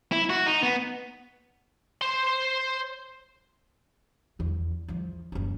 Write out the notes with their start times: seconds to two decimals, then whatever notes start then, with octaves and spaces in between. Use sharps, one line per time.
0.12 E4
0.30 F#4
0.46 D#4
0.63 B3
2.02 C5 C6
4.39 E2 D3
4.88 E2 F3
5.32 F#1 F#3